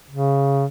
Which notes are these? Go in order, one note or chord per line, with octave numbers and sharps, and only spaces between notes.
C#3